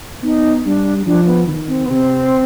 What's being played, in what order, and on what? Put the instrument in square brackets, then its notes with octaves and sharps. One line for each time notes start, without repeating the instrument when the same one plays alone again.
[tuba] B3 [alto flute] D#4
[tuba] G3 [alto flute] D4
[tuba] F3 [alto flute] D4
[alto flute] B3
[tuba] D#3
[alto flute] C4
B3
[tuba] C3 [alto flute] C4